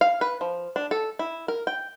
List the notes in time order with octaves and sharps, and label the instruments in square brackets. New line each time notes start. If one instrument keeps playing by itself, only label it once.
[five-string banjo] F5
B4
F3
D4
A4
E4
A#4
G5